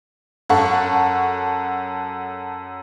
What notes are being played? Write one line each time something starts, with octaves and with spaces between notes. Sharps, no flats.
F#2 A4 F#5 C#6